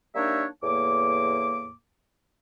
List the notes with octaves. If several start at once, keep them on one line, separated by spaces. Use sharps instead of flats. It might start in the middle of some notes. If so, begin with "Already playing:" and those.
G3 A#3 D4 D#4 C#5 E5
E2 A2 A#3 D6